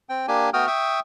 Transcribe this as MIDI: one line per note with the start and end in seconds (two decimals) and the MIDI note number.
0.09 0.26 60
0.09 0.26 79
0.28 0.50 58
0.28 0.50 62
0.28 0.50 67
0.28 0.50 80
0.54 0.67 57
0.54 0.67 59
0.54 0.67 66
0.54 0.67 79
0.54 0.67 87
0.54 0.67 89
0.67 1.00 76
0.67 1.00 79
0.67 1.00 85
0.67 1.00 87